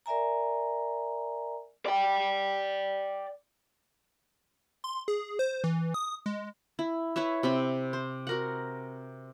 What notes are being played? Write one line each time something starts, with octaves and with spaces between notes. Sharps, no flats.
A#4 D5 E5 G#5 A#5
D5 G5
C6
G#4
C5
E3
D#6
G#3
E4
E4 B4 C#5 E5
C3 C4 B5
C5
F#4 A#4 F#5